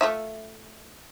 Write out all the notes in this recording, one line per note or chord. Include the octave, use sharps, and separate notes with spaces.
A3 F4 E5